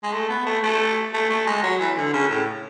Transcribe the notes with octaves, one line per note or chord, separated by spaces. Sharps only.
G#3
A3
B3
A3
A3
A3
A3
G#3
F#3
E3
D3
C#3
A2